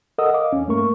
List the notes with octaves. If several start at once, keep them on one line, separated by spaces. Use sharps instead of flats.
A4 A#4 D#5 F#5 D#6 E6
D#5 F5 D6
E2 C#4
G2 A3 A#3 A#4 C#6